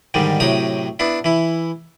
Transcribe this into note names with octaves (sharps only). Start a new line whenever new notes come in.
G#2 D3 D#3 G3
A2 C3 F#3 G5 A#5 D#6
B3 D4 E4
E3 E4